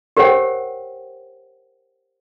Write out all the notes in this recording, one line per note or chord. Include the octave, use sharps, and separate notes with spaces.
G4 A#4 C5 C#5 F#5 G5